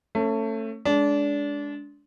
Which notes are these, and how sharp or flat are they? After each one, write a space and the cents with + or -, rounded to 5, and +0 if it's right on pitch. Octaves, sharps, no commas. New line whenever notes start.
A3 +25 C#4 -25
G#3 +15 D4 -25